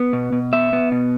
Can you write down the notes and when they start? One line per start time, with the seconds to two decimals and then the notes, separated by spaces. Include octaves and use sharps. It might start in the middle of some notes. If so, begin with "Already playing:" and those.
Already playing: B3
0.13 B2
0.32 B2
0.53 B3 E5
0.73 B3
0.92 B2